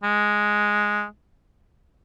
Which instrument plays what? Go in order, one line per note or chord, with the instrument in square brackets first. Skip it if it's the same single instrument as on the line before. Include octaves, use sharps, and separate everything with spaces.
[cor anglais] G#3